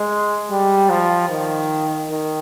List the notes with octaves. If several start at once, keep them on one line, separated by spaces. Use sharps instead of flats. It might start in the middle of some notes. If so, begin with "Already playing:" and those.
Already playing: G#3
G3
F3
D#3
D#3